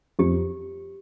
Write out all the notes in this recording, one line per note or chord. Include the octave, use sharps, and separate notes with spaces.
F2 G4